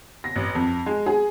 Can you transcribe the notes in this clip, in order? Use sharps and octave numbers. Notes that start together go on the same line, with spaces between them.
A#6
A1
F2
G#3
G#4